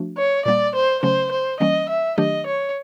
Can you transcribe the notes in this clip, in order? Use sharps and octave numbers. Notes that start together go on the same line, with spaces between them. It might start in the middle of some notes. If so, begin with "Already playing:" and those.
Already playing: F3 A3 D4 F#4
C#5
A#2 G3 A#3 D5
C5
C#3 F#3 A3 C#4 C5
C5
E3 G3 A#3 C#4 D#5
E5
D#3 F#3 A3 D4 G4 D#5
C#5